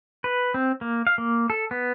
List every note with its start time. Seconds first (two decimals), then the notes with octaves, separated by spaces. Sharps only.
0.24 B4
0.54 C4
0.81 A#3
1.07 F5
1.18 A#3
1.50 A4
1.71 B3